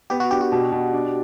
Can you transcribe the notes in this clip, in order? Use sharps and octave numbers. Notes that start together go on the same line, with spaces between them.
B3 G4
F#4
D4 G4
F#4
B2
B2
D4